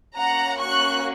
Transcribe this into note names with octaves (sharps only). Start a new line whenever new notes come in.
A#3 C#4 F#4 F#5 A#5
C#6 F#6